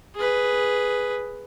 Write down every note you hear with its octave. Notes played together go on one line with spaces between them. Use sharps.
G#4 B4